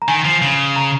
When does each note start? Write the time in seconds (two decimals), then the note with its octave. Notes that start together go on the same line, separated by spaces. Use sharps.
0.02 A#5
0.08 D#3 G#5
0.25 F3
0.42 C#3
0.76 A#5